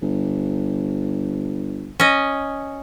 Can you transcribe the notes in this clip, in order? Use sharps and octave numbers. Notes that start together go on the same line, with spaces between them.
G1
C#4 D#5